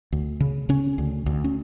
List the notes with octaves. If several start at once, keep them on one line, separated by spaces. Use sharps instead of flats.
D2
C#3
C#3 C#4
D2
D2
C#4